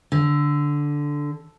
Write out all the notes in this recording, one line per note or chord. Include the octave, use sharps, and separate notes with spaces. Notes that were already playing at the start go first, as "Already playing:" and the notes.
D3